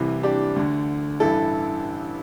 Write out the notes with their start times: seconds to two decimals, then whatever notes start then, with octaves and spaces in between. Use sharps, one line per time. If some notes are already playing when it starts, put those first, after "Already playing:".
Already playing: C2 C3 E3
0.23 D4 G4
0.56 D2 D3
1.20 A1 G2 E3 E4 A4